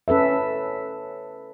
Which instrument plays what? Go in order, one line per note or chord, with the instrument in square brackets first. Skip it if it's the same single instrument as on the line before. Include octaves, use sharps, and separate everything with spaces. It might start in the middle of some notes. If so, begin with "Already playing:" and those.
[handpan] C#4 A4 B4 E5